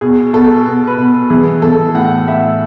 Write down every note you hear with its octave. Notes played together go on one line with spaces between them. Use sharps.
B2 G#4
B2 A4
B2
B4
B2
E3 G#4
E3 A4
A2 F#5
A2 E5